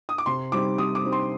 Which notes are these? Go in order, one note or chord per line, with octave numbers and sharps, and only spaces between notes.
D#6
D6
C3 C6
G3 C4 D#4 D6
C3 D#6
D6
G3 C4 D#4
C6